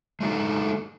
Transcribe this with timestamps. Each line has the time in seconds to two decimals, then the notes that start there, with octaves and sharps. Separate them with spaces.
0.21 G#3 A3 D4 D#4 G#4